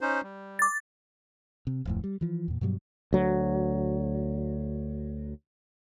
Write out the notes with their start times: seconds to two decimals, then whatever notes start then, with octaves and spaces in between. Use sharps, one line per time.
0.01 C#4 D#4 C5
0.23 G3
0.59 D6 A6
1.67 C3
1.85 D1 F2 A2
2.04 G3
2.21 E3 F3
2.48 E2 A#2
2.61 G2 B2 F#3 G3
3.13 D2 F#3